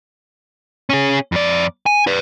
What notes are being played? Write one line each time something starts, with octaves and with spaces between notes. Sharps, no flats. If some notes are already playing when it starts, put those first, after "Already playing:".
C#4 G#4
F2 D5
G#5
B4 D5